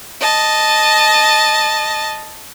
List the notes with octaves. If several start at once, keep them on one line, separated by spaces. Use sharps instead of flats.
D#5 A5